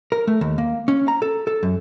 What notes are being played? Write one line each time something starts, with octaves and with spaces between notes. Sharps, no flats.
A#4
A3
D#2
A#3
C#4
A#5
A4
A4
F#2